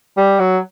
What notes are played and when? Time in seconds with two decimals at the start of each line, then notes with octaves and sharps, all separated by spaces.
0.17 G3
0.39 F#3